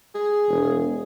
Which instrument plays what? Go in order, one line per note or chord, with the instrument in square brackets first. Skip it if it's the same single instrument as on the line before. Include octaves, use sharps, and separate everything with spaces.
[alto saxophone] G#4
[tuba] E1